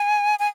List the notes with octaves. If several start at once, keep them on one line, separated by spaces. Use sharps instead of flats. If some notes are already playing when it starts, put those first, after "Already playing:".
Already playing: G#5
G#5